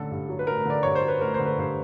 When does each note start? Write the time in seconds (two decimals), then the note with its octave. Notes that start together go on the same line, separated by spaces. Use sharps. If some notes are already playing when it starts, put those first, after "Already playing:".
Already playing: A1 D3 A4
0.11 G2
0.29 F#3
0.39 B4
0.47 A1 A#4
0.65 D3 D5
0.83 G2 C#5
0.95 C5
1.03 F#3 B4
1.21 A1 A#4
1.34 D3 C5
1.45 B4
1.58 G2 C5